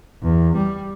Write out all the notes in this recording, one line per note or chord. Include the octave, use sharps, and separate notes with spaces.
E2
G3